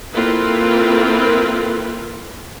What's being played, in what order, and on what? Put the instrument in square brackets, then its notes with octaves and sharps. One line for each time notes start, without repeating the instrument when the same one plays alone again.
[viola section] A#3 C4 E4 F4 A4 B4